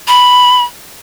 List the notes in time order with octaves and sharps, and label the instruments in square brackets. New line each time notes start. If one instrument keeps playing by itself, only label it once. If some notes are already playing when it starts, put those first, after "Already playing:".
[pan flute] B5